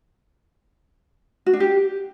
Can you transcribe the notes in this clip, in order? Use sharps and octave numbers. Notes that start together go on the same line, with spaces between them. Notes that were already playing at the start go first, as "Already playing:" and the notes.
F#4
D4
G4